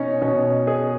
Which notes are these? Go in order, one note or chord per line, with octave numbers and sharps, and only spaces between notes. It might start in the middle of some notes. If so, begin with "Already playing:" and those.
Already playing: B2 C#4 D#4
B2 C#4
G#4